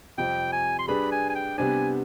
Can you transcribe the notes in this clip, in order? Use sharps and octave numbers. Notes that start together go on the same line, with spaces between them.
F2 C3 G3 C4 F4 G5
G#5
C6
G3 D4 G#4 B4 B5
G#5
G#5
G5
C3 G3 B3 D4 G#5